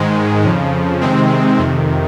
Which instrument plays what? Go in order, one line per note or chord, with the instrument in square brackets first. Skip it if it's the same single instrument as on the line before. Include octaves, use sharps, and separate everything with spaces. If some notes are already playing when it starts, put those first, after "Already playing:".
Already playing: [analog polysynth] G#2 D#3 G#3
F2 C#3 F3
C3 D#3 G#3 C4
F2 C3 D#3